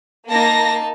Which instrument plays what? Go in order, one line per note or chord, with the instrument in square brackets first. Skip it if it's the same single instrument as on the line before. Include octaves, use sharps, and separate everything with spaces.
[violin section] A#3 A#6 [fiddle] D#4 A5